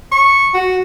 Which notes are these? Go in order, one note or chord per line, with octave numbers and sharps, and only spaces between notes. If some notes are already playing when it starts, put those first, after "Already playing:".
C#6
F#4